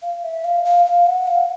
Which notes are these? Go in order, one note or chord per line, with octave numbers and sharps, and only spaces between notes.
F5
E5
F5
F5
F5
F#5
F5